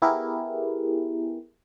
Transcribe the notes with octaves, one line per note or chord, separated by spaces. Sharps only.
B3 E4 G4 G#4 A#4